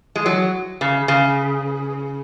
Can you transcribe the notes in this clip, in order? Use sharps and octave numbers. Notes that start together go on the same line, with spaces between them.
G#3
F#3
C#3
C#3